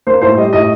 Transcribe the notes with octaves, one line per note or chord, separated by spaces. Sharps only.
A#3 C5
A2 C5
G3 D#5
A2 D#5